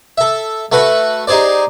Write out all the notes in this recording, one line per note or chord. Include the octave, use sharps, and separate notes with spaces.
A4 E5
A3 F#4 B4 F#5 B5
D#4 G4 G#4 C5 D5